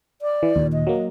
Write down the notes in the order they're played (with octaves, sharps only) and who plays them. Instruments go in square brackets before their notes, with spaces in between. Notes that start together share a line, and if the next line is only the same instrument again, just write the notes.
[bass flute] D5
[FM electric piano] E3
D#2 A#2
[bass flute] D#5
[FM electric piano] F#3 A#3